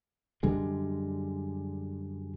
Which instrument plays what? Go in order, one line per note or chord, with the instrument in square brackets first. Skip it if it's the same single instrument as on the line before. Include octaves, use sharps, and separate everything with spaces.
[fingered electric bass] F#2 D3 G3 G#3